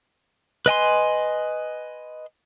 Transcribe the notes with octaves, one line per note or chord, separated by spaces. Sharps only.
B4 D#5 G#5 C6